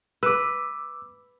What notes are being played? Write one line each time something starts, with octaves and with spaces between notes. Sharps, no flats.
B4 D6 E6